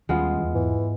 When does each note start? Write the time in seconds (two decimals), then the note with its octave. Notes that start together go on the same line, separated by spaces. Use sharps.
0.09 D#2 G3 G#3 B3 C#4 F4
0.38 E2
0.55 G#2 E3